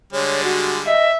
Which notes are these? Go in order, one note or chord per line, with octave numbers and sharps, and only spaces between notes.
D3 G3 G#3 C#5
F#4
D#5 E5